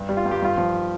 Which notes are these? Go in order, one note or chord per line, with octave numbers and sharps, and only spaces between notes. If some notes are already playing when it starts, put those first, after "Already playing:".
Already playing: G2
G3
F4
G2
G4
G2 F4
F3